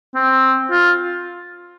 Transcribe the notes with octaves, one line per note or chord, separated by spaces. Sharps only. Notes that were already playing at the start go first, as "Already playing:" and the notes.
C4
F4